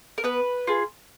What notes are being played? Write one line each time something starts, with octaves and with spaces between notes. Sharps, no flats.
A#4
B3 B4
F4 G#4